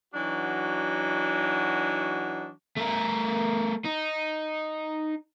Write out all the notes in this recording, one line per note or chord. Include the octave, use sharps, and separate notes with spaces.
E3 F#3 D4 D#4 F#4
A3 A#4
D#4